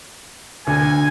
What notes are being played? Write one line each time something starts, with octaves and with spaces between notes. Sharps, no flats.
D2 G#5